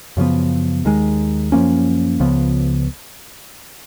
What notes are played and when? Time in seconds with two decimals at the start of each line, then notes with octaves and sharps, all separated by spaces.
0.17 F#2 C#3 F3 B3
0.85 D#2 D#3 G#3
1.52 F#2 F3 A#3 C#4
2.20 C#2 C#3 F3 B3